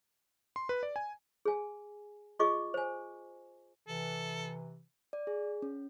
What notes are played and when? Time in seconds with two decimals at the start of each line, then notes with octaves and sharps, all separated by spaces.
0.56 C6
0.69 B4
0.83 D5
0.96 G#5
1.45 G#4 G#5
2.39 F4 G#4 D#5 C#6 D6
2.74 C5 G#5
3.88 C3 E3 A4
5.13 D5
5.27 G#4
5.62 C#4